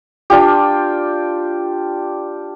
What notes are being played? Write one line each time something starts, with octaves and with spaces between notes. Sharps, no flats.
D4 F4 G4